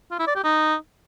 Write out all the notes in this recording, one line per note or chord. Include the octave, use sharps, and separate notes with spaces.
F4
E4
D5
G4
D#4